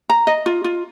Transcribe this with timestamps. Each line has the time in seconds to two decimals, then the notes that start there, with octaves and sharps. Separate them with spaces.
0.10 A#5
0.27 D#5
0.46 F4
0.64 F4